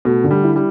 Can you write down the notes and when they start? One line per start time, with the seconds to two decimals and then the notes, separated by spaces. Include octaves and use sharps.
0.05 B2 A3
0.24 D3
0.31 G3
0.44 E4
0.56 G3